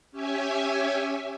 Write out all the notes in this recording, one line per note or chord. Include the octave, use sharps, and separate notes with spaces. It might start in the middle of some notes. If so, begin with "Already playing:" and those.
C#4 G4 C#5 E5 G#5